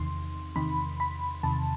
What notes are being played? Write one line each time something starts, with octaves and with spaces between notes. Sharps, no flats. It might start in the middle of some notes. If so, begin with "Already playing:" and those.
Already playing: E2 C3 D#3 C6
E2 C3 D#3 B5
B5
E2 C3 D#3 A5